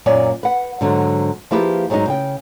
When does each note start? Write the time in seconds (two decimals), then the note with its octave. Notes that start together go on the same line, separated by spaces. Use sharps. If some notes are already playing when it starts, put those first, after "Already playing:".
0.06 F#2 A#2 C#5 D5 G#5
0.43 B4 F#5
0.81 G#2 D3 F#3
1.51 F3 A#3 E4 G4 G#4 B4
1.90 G#2 F#3 G#3 B3 D#4
2.08 C#3 G5